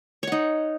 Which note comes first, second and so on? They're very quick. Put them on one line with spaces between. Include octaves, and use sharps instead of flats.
C#5 F#5 D#4